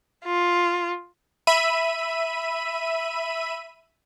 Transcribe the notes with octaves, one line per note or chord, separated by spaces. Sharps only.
F4
E5 B5 D#7